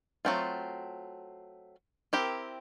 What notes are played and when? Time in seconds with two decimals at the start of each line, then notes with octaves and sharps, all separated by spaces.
0.25 F#3 A3 C4 F4
2.13 C4 E4 G4 A#4